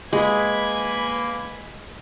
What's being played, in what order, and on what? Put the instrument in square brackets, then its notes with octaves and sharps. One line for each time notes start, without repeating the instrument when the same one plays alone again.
[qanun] G#3 [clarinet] A#3 [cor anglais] B4 [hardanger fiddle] G#5 B5